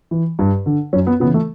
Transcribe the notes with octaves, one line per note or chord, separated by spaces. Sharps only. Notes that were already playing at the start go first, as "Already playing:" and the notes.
E3
G2
D3
F#2 C#4
B3
C#3 E3 B3
A3